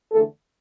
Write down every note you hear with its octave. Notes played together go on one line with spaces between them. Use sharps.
E2 D3 A3 A4